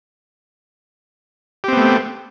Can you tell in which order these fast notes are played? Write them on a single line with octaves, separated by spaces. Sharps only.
G4 C4 B3 A3